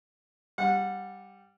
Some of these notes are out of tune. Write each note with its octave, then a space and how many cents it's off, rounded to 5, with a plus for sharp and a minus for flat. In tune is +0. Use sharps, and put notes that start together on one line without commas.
G3 +0 F#5 -25